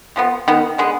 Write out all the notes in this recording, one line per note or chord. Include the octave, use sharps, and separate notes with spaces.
C3 F3 B3
D#3 B3
D3 G#3 B3